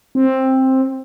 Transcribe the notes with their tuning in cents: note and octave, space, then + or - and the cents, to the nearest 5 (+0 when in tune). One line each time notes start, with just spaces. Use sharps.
C4 +10